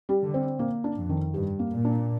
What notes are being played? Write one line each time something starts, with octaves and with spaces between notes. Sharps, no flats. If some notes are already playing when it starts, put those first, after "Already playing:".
G3
D3
C4
A#2 A#3
D4
F2
D#3
G2 G4
A#3
A#2
D4